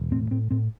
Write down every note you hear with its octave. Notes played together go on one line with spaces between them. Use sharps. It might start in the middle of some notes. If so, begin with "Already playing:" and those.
Already playing: E1
A2 C4
A2 C4
A2 C4